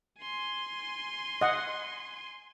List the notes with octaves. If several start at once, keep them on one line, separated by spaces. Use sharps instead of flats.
G#5 C6
D#5 F#5